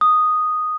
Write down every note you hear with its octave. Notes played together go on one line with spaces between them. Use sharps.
D#6